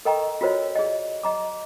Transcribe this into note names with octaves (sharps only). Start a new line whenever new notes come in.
A4 A#4 D#5 G5 A#5 C#6
F4 F#4 A#4 C5 C#5 D#5
G#4 D5 D#5
D#5 A#5 D6